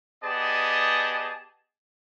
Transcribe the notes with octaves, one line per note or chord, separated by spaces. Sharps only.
B3 G4 G#4 D5 D#5 A5